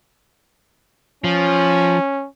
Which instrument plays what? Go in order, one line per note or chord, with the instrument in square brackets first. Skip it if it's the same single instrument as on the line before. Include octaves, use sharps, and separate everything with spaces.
[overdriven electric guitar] F3 [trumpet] C#4